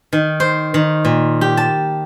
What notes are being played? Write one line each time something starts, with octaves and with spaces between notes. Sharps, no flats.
D#3
C5
D#3
A#2
G4
A5